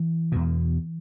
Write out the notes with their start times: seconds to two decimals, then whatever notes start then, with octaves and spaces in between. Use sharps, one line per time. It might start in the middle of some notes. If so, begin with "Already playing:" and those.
Already playing: E3
0.32 E2 B2